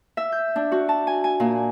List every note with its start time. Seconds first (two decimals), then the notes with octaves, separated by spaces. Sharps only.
0.17 E5
0.32 G6
0.56 D4
0.72 F#4
0.89 A5
1.07 G#5
1.24 G#5
1.40 A#2